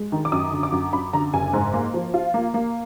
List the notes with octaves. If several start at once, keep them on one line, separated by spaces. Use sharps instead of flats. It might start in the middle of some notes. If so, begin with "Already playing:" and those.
Already playing: G#3
D#3
D6
F#2 D#6
D3
D6
F#2
F#2 B5
D3 A#5
F#1 G#5
G#2
A#3
F3
F4
A#3
A#3